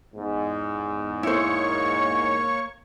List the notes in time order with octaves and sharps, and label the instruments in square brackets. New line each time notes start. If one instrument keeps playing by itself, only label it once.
[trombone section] E2 G#2
[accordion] A#3 C#5 C#6 [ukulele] E4 C5